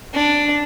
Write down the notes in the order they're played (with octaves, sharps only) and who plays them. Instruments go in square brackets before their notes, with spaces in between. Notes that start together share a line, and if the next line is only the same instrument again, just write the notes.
[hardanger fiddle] D4